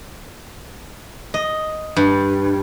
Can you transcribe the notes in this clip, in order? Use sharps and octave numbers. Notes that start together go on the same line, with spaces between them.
D#5
G2